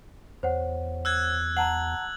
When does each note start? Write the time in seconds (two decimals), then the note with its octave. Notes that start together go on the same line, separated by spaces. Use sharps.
0.43 E2 C5 C#5 F#5
1.05 E6 F#6 G#6
1.57 F#5 A5 A#5 F#7